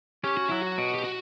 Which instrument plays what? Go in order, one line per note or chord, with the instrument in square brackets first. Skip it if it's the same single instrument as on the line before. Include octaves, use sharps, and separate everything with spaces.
[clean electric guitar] C#4 [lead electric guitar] G4
[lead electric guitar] F#4
[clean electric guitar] F#3 [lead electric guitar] E4
[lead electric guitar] F#4
[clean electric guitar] B2
[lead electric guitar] G4
F#4